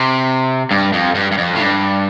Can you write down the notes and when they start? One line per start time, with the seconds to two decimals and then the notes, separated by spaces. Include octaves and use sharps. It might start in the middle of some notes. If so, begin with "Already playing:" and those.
Already playing: C3
0.71 G2
0.93 F2
1.15 G2
1.32 G2
1.38 F2
1.55 A2
1.60 G2